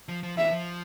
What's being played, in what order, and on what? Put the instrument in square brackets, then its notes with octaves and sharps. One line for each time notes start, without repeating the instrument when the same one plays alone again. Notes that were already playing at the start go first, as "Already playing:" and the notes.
[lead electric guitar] F3
F3
[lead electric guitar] E3 [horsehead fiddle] E5
[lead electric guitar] F3